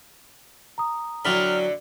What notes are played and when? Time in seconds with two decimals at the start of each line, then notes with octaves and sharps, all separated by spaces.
0.78 A#5 D#6
1.25 D3 F#3 E4 D5 G5 B5 F6